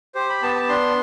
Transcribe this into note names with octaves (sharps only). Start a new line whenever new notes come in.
G4 C5
B5
B3 A5
A5
D4 C6